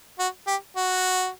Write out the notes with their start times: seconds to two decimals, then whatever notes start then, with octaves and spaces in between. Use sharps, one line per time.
0.19 F#4
0.47 G4
0.76 F#4